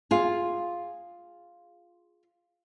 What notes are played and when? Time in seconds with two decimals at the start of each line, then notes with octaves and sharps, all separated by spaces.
0.11 F4 G#4